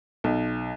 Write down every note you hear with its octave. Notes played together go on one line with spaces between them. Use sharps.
B1